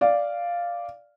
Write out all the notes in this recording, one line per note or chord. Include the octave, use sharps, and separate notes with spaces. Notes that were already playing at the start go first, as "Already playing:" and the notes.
D5 F5